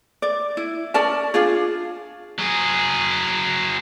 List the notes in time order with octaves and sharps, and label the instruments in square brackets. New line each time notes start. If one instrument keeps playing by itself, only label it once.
[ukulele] D5
E4
C#4 A#4 D5 A5
D4 F4 G#4
[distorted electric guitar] F#3 G#4